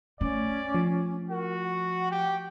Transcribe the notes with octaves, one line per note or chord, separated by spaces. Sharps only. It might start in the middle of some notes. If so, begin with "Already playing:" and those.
A3 C#4 D5
F3
F#4 A#4
F#5
G4